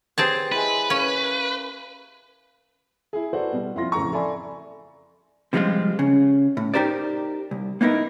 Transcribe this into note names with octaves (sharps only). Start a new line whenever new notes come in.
C4 G4 G#4 B4 C#5 A5
G#3 E4 B4
A#3 C#4
E4 G#4
F#4 A4 B4 C5 D5 F#5
B2 G3
F2 E4 F4 C6 A#6
A1 F2 C#3 A#5 C#6
A4 D5 E5 G#5 B5 C6
C3 F3 G3 G#3 C4 F4
C#3
A2
D#4 G4 A#4 C5 D5
C2
A#3 B3 D#4 E4 A#4